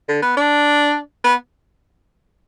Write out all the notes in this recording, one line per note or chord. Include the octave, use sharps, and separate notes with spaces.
D3
B3
D4
B3